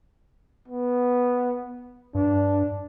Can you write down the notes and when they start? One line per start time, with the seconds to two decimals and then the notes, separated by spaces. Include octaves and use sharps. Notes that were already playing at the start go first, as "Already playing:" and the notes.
0.68 B3
2.15 G2 D4